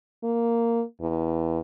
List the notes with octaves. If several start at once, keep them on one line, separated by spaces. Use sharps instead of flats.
A#3
E2